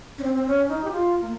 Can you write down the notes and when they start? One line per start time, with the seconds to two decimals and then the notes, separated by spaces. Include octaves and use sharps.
0.18 C#4
0.23 C4
0.35 C4
0.46 C#4
0.69 D#4
0.84 G4
0.91 F4
1.21 A#3